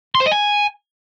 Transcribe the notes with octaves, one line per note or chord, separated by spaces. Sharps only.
C6
C5
D#5
G#5